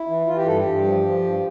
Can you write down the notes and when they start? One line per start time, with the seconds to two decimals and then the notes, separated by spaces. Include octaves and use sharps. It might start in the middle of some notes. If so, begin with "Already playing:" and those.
Already playing: E4
0.08 E3
0.27 E3 F4
0.37 G4
0.46 G2 A4
0.56 G4
0.66 G2
0.85 F3
1.05 F3
1.23 G2